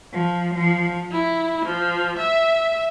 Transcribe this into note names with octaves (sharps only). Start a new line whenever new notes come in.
F3
F3
E4
F3
E5